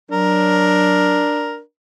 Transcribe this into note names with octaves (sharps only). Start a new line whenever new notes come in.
F#3 D4 A#4